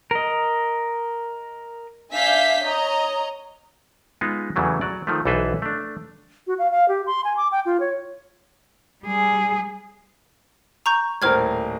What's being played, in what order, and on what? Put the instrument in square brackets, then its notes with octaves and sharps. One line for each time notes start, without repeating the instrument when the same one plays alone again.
[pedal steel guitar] A#4 D#5
[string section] D4 E5 F5 G#5 G6 B6
C#5 D#5 A#5
[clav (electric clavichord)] G#3 B3 D#4 F4
E2 C#3 E3 F#3 A3
F#3 D5
D#3 F3 A3
B1 E3 A4 B4 C5 E5
A3 D4
[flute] F#4
F5
F5
G4
C6
G#5
D6
G5
F4
C#5
[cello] G3 G#4
[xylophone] A#5 C#6 G6
[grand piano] D#1 A2 A#4 [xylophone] C5 F6 G#6